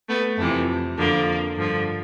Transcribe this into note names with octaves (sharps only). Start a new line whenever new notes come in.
A3 B3
F2 C3 E3 A3
F2 D3 F3 A#3
G2 D3 F3